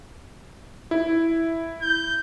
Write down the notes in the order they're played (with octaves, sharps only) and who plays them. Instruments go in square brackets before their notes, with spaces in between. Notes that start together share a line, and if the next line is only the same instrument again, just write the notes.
[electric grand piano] E4
[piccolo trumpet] G6